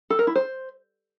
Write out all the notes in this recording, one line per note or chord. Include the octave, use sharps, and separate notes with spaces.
A4
A#4
E4
C5